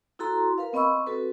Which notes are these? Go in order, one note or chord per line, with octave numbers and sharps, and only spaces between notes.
E4 F#4 A4 A#5 C6
A#4 B4 F5
B3 C4 D#5 B5 C#6 E6
C4 F#4 A4 B4